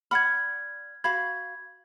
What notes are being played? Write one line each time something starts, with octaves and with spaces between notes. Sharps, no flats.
D5 F#5 B5 F6 G#6
F#4 F5 B5 G#6